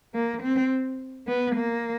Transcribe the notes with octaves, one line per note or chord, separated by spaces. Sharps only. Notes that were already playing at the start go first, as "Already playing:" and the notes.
A#3
C4
B3
A#3